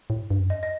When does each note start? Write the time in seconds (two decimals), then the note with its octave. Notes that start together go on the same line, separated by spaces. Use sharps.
0.10 A2
0.21 G#2
0.30 G2
0.40 F#2
0.50 F2 D#5
0.63 D#5